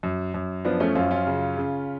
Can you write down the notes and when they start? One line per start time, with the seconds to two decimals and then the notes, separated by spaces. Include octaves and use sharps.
0.03 F#2
0.34 F#2
0.65 F3 B3 D4
0.80 A3 C#4
0.95 F#2 C#4 F4
1.11 C#4 F4
1.27 C#3
1.57 C#3